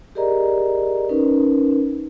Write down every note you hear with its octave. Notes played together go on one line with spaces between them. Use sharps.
G4 G#4 A#4 D5 D#5 A#5
C#4 D#4 A#4 B4